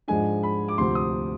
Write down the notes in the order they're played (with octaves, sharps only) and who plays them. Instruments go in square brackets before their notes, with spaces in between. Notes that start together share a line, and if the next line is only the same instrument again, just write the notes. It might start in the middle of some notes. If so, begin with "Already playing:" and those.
[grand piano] G#2 F3 G#3 D4 G#5
B5
D6
D2 C3 F3 C6
D#6